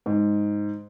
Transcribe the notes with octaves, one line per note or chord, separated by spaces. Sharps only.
G#2